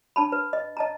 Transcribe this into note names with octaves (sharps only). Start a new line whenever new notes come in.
D4 A5 B5
B4
D#5
D#5 A5 A#5